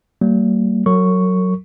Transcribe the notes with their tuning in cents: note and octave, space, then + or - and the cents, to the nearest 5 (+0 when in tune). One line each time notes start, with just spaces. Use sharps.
G3 -45 A#3 -35
F#3 +0 A#4 -40 C#6 +0